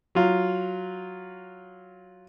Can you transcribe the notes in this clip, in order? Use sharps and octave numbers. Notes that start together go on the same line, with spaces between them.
F#3 F4